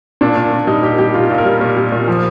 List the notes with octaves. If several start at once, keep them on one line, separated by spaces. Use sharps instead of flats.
A#2 D4
A#2
A#2
G3 D#4
A#2 G4
G3 G4
A#2 F4
A#2
A#4
G3
A#2
G3
A#2
F3